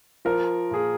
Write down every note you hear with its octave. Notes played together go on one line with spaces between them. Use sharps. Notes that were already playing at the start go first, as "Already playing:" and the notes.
F3 A#4
A#2 G#4